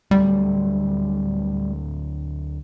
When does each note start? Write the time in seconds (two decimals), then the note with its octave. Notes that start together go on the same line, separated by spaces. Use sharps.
0.11 D2 F#3 G3 A3